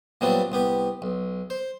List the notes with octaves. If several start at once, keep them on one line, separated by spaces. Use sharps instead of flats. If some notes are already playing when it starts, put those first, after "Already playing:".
A#2 F#3 G3 B3 C4 D4
C2 B3 G4
B1
C5